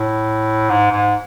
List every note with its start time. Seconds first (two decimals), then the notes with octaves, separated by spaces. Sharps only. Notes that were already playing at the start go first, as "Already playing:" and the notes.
Already playing: A2
0.69 G#2
0.91 G#2